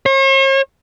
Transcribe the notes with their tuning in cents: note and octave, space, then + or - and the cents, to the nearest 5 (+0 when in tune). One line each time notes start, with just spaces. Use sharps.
C#5 -45